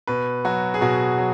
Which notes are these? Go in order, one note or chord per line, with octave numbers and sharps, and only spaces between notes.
B2 B4
F#3 F#4
G#4
B2 F#4
F#3